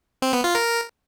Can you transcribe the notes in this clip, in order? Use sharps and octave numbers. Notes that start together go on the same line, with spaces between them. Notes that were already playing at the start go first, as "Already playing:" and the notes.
C4
B3
F4
A#4